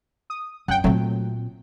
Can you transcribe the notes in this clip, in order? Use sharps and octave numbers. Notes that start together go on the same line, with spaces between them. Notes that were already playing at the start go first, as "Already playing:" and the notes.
D#6
F#2 F#5 G5
A#2 F#3 A3 C4